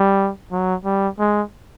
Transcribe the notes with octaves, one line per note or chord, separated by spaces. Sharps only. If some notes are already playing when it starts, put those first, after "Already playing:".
Already playing: G3
F#3
G3
G#3